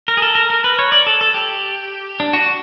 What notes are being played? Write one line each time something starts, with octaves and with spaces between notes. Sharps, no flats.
A#4
G#4
A4
A#4
A#4
B4
C#5
D5
A4
A4
G4
D4
F#4